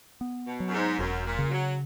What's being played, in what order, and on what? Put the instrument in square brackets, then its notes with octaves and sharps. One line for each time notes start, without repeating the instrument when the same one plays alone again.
[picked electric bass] B3
[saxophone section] B2
[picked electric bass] F#3
[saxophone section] F#2
G#2
[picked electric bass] E1 [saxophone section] F#2
[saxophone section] A#2
[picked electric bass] C#3
[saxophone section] F#3